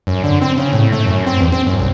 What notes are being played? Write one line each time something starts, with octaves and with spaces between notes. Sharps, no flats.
F#2
D3
C4
C#3
A2
A3
F#2
C4
E2
C4
F#2
C2